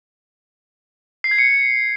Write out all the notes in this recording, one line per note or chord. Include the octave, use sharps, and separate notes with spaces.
C7
G#6
C#7